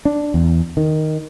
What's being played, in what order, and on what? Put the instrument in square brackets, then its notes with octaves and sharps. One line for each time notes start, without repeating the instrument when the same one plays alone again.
[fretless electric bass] D4
E2
D#3